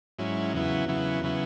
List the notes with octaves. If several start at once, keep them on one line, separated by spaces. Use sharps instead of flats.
G#2 F#3 C#4 E4
E2 C#3 F#3 B3 E4
E2 C#3 F#3 B3 E4
C#3 F#3 B3 E4